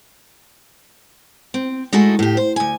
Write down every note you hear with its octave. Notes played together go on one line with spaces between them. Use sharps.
C4
G#3 A3 D#4 E4 F#4 A4
A2 G4
C5
D2 G#5